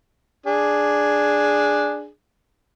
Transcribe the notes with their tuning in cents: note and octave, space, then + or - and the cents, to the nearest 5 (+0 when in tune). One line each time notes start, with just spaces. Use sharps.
D4 +0 G#4 +0